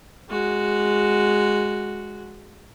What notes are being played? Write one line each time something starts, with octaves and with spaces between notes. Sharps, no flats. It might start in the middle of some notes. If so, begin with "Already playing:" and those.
G#3 F#4